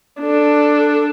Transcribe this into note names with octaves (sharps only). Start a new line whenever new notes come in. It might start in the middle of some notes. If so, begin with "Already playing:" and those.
D4 A4